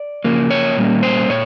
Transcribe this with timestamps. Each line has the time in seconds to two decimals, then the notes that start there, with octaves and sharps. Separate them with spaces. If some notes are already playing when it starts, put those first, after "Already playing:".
Already playing: D5
0.24 C#3 F3 A#3
0.50 C#5
0.76 A#2 G3 A#3 C#4
1.03 C5
1.29 A#2 C#5